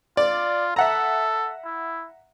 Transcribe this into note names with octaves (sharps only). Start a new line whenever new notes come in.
F4 D5
A4 E5 F#5 A#5
E4